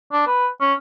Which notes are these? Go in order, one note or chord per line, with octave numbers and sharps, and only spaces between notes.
D4
B4
C#4